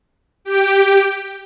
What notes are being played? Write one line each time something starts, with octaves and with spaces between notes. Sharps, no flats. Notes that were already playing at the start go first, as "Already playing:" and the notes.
G4 G5